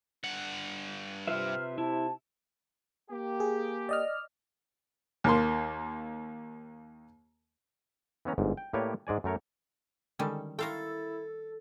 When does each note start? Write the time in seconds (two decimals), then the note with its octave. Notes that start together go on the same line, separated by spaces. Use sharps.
0.24 G2 F#5
1.27 C3 F4 B4 E5 F6
1.78 E4 A5
3.11 A#3 G4
3.40 G#4
3.89 D5 D#5 F6
5.24 D#2 A#3 C6
8.25 E3 B3 C#4 A#5
8.38 G1 G#2
8.57 G5
8.73 A2 A#3 G4 B4 C#5 D5
9.07 G#2 G#3 D5 G#5
9.24 F#2 A3 A#4 C#5
10.19 D3 D#3 G3 G#3 C#4 A4
10.59 E4 A4 A#4 F5 G5 C6 C#6